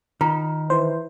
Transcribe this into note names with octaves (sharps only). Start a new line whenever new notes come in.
D#3 F4 A#5
E3 C5